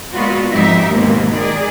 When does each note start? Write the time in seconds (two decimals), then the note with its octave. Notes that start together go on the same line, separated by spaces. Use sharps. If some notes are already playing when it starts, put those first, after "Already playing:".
0.12 A#2 G#3 B3 F4 F#4
0.50 F2 G#2 D#4 G4 E5
0.93 D#2 G#2 B2 A#3 C4
1.33 D#3 G#4 D5